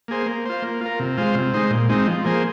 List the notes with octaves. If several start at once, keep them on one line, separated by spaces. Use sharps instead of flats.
A#3 G#4 C5
A#3
F4 C5
A#3
F4 A#4
C3
G#3 F4 C5
C3
G#3 D#4 C5
A#2
G#3 C4 D#4
F3
A#3 G#4 C5